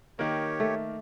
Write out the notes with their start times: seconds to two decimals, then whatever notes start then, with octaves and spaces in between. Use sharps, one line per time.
0.19 D#3 A#3 G4 C#5
0.60 A3